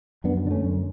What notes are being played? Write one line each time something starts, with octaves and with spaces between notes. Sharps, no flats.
F#2 B3 D4
D3 D4
A3 C#4
F#2